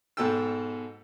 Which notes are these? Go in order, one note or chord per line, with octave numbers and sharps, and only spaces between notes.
G#2 B2 A4 G5 E6